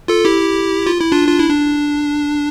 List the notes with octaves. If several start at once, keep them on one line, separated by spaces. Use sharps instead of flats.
F4 A4
E4 G4
F4
E4
D4 F4
F4
E4
D4